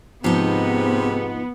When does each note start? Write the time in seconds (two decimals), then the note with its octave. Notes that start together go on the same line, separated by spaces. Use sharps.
0.24 G#2 C3 F3 B3 D#4